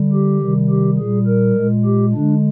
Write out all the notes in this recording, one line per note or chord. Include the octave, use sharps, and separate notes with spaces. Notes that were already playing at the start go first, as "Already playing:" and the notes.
Already playing: D3 G3
G4
C3 D#3 G3
G4
A#2 G3 G#4
A#4
A#2 G#3
G4
D3 G#3 D4